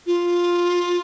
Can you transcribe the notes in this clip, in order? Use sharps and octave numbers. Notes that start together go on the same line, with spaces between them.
F4